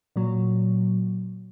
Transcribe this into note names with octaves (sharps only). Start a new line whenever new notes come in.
A#2 F#3